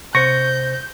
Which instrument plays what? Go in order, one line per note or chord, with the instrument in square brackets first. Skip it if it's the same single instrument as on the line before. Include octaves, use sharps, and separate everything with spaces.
[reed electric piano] C3 C5 [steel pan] C#6 [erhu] G6 [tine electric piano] A#6